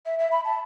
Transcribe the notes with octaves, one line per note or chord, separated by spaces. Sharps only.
E5
E5
B5
A5